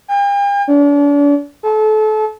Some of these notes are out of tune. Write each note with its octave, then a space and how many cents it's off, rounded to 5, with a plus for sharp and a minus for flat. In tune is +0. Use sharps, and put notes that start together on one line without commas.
G5 +45
D4 -40
A4 -30